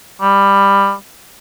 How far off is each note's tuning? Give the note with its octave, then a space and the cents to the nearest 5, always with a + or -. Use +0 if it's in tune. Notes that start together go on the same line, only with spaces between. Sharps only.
G3 +15